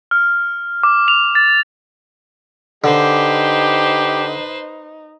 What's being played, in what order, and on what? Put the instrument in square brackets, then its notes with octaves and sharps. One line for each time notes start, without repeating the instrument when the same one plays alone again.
[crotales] F6
D6
F7
A6
[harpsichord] D3 [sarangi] D#4 [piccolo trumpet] G4 [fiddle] B4 C5